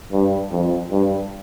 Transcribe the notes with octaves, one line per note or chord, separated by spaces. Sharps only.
G2
F2
G2